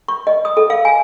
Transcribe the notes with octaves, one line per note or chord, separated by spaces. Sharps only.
C#6
D#5
D#6
A4
F5
G#5